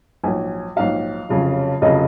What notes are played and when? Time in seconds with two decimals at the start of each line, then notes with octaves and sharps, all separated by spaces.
0.24 A#1 G#2 F#3 G#5
0.76 A#1 G#2 F#3 F5
1.29 F1 F2 C#3 F#3
1.81 F1 F2 C#3 F#3 D#5